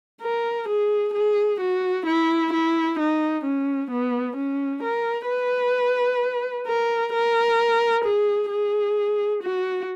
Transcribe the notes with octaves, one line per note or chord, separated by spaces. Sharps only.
A#4
G#4
G#4
F#4
E4
E4
D#4
C#4
B3
C#4
A#4
B4
A#4
A#4
G#4
G#4
F#4